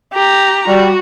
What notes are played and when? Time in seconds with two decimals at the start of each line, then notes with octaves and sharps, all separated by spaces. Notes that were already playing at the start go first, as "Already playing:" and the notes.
0.13 G4 A#5
0.67 G3 F#4